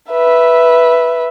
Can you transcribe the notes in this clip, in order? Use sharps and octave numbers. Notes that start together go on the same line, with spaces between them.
B4 E5